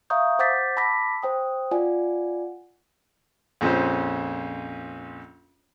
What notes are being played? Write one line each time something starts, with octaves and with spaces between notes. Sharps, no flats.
E5 F5 A#5 C#6 D#6 G6
C5 F#5 D6 G6 A6 B6
A5 B5 D6 E6 A#6 B6
C5 G5 D#6
F4 D5 F#5 G#5
A#1 F2 C#4 C5